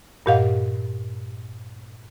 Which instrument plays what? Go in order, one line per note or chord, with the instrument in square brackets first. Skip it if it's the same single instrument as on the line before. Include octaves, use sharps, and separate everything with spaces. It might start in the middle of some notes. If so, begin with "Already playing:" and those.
[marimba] G2 A#2 G4 D#5 F5 F#5